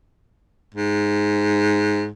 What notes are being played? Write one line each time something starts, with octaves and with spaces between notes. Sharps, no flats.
G#2